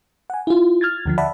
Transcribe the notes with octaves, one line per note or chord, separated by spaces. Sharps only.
F#5 G#5
E4 F4
F6 G#6 A6
D#2 D3 F3
D5 E5 F#5 A5 B5